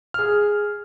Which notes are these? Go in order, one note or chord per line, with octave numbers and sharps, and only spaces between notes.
G#4 F6